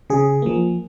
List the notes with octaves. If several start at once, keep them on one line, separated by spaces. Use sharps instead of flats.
C#3 G#4
F3 A#3